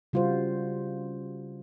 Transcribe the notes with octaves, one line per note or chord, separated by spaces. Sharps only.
C#3 G3 F4 F#4 C5